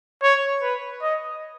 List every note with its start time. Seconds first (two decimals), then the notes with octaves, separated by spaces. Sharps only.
0.23 C#5
0.62 B4
1.02 D#5